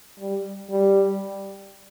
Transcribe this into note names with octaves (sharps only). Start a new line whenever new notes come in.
G3
G3